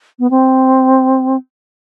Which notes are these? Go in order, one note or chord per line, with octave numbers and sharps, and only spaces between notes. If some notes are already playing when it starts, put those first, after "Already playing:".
B3
C4